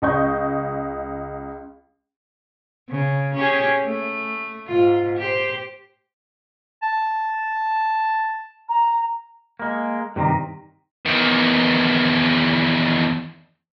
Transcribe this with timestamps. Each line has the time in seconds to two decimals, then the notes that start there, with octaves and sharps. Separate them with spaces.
0.02 C#2 D#5 C#6 G6
2.89 C#3
3.35 C#4 G4 G#4
3.83 A3
4.67 G#2 F4
5.18 G4 C5
6.82 A5
8.69 A#5
9.59 G#3 A#3
10.16 G2 C3 D#3
11.05 E2 D#3